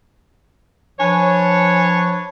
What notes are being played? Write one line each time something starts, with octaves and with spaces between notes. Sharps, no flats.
F3 D4 B4 C#5 G#5